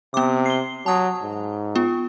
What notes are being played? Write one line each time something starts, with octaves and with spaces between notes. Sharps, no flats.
C3 B3 D6
C7 G7
F#3 A5 D#6
G#2
B3 F4